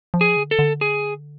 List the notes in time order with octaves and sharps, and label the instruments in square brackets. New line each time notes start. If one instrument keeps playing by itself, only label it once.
[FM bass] F3
[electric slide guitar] G#4
[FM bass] D3
[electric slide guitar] A4
[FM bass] D3
[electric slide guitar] G#4